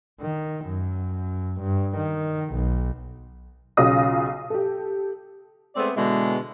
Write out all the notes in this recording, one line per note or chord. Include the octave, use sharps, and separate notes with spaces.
D#3
F#2
G2
D#3
B1
B1 C#3 F4 D#6 A#6
G4 A4
G#3 A3 B3 C4 D5
B2 D3 E3 G#3